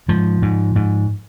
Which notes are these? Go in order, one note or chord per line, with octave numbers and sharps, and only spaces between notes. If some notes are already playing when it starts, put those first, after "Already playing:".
G#2 F3
G#2
G#2